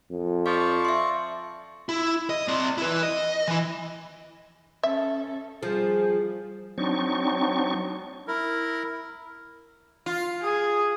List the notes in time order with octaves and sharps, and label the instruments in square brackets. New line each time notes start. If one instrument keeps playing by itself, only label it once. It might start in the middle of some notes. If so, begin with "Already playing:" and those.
[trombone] F2
[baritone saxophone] F3 [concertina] D5 C#6 [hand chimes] F5
[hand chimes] E5 C6
[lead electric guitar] E4
D#5
C4 D5
E4 B4
D#5
E3 E4
[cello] C#4 A4 [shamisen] E5
[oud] F3 [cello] G3 [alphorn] G#4
[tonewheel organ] F#3 C4 D4 D#4 C#6
[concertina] E4 A#4
[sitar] F4
[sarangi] G#4 [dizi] D#6